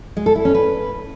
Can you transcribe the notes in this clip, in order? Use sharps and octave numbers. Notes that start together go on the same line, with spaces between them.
G#3
A4
E4
C#4
B4